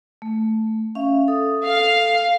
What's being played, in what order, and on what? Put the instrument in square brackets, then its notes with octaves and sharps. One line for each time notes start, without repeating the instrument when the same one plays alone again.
[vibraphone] A3
C#4 E5 F5
A4 D#6
[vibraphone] A4 [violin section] F5